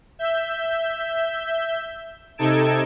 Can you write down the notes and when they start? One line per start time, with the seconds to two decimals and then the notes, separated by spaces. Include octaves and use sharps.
0.19 E5 G6
2.38 C3 D#4 A4 G#6 D7 E7